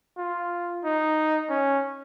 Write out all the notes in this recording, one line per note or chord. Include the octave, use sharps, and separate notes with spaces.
F4
D#4
C#4